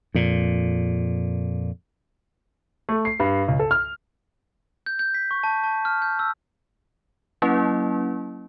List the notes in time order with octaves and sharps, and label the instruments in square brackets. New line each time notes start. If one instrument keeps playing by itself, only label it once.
[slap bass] F2 A#2
[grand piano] A3
C7
G2
C#2
A4
F6
[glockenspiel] G6
G6
B6
C#6
A5
A5
F6
G6
E6
[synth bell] F#3 A#3 C#4 E4